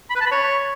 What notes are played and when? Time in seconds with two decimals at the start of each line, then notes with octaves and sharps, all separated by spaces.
0.10 B5
0.16 B4
0.21 A5
0.26 B5
0.31 C#5